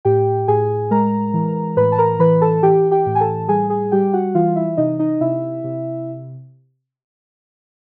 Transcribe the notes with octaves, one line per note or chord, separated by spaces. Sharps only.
A2 G4 G5
A2 G#4 G#5
G#3 A#4 A#5
E3
A2 B4 B5
A5
A#4 A#5
E3 B4 B5
A4 A5
E3 G4 G5
G4 G5
A2
G#5
A4 A5
G3 G#4 G#5
G#4 G#5
G3 G4 G5
F#4 F#5
E3 F4 F5
E4 E5
C3 D#4 D#5
D#4 D#5
C3 E4 E5
C3